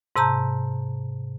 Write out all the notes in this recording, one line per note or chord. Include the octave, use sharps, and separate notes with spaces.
G#2 C3 A5 A#5 G6